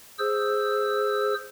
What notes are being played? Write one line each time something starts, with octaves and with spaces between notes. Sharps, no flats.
G#4 C5 E6